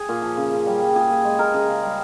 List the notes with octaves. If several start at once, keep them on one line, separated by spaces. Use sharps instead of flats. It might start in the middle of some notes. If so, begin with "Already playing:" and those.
Already playing: G#4
A#2
F3
C#3
C#3
G3
G3
A#2 G#4
A#2
G#3
G#3 A#4
C#3 G#4
C#3
G3